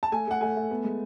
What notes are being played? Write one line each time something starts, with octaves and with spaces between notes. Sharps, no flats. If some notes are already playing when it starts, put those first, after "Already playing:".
A5
A3 G#5
A3 F#5
A3 G#5
A3
B3
G#3